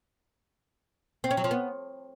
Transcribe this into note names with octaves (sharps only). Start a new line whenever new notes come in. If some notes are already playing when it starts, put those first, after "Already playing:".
C4
C#4
F#3
F3
B3